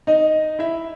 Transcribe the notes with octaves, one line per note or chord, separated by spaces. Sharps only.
D#4 D#5
E4 E5